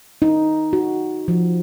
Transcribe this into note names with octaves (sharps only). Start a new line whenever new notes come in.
D#4
F#4
F3